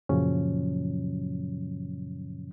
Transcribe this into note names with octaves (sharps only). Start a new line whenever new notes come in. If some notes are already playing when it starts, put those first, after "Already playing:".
F#2 A#2 C#3 F3 F#3 C#4